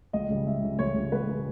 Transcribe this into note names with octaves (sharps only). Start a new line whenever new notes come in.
C#2 D#5
C#3 G3
C#2 E5
C#3 G3
C#2 C#5
C#3 G3
C#2 B4
C#3 G3